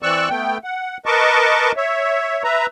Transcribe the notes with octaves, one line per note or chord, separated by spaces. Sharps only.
E3 C4 D5 C#6 E6 F#6
A3 B3 G5
F#5
A#4 B4 D#5 A5 C#6 D6
C#5 E5
B4 E5 A#5